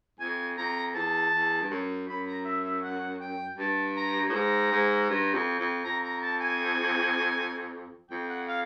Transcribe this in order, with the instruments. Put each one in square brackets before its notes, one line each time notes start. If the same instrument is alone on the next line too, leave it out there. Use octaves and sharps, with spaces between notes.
[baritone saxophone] F2 [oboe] G#5
[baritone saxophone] F2 [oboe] A#5
[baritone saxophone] E2 [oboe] A5
[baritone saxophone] E2
G2
F#2
[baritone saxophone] F#2 [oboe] B5
[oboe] A#5
E5
E5
F#5
G5
[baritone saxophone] G2 [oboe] A5
[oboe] A#5
[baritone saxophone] A2
[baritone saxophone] G#2 [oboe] A#5
[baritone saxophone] G#2
G2
F2
F2
[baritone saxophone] F2 [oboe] A#5
[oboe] A#5
A5
G#5
[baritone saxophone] F2 [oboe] G5
[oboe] F#5
F5